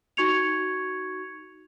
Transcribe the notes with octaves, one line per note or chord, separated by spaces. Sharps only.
D#4 F#4 C#6 G#6 C#7 F7